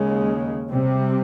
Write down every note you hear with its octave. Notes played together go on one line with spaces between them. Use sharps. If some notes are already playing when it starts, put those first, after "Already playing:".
Already playing: D#2 C#3 G#3
C3 G3 C4